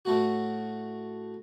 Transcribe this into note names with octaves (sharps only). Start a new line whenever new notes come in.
A2 A3 F#4